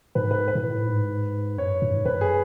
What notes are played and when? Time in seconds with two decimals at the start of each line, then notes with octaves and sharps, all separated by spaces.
0.15 G#2 B4
0.31 B4
0.48 B4
0.55 G#2
0.63 A2
0.87 G#2
1.58 F#2 C#5
1.82 G#2
2.05 F#2 B4
2.21 G#4